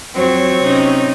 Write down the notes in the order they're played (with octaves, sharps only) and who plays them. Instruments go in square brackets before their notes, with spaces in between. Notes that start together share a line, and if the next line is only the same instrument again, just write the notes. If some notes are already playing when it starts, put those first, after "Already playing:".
[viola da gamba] F2 F#3 [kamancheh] C4 C#5
[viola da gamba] C3 C#4 D#4